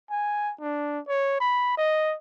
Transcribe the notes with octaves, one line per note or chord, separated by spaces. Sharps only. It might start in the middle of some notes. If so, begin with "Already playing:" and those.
G#5
D4
C#5
B5
D#5